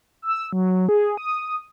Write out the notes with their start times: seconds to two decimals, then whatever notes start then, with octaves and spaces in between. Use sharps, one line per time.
0.22 E6
0.53 F#3
0.89 G#4
1.17 D#6